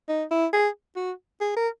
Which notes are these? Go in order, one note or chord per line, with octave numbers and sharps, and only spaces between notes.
D#4
E4
G#4
F#4
G#4
A#4